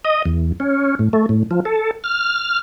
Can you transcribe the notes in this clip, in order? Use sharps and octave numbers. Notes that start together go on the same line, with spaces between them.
D#5
E2
C#4
A2
A3
A2
F3
A4
F6